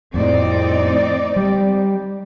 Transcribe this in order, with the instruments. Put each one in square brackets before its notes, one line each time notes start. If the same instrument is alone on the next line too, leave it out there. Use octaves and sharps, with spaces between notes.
[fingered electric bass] F2 A2 [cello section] C4 D#4 D5
[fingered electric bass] G3